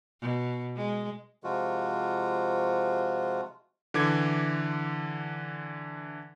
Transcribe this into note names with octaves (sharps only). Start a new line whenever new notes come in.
B2
G#3
C3 F3 G#3 F4 F#4
D3 E3 D6 G#6